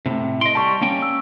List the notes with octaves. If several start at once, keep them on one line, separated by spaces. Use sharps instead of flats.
A2 C3
D#5 C6 D7
G3 A5 C#6
A#3 C#4 G5
E6